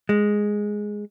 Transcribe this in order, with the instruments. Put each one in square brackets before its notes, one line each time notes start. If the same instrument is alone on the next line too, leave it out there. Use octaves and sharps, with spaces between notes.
[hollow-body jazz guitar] G#3